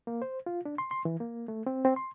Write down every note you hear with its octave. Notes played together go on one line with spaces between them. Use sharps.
A#3
C5
F4
D4
C6
C6
E3
A#3
A3
C4
C4
C6